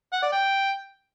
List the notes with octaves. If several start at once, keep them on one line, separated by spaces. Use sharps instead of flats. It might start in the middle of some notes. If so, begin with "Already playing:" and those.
F#5
D5
G5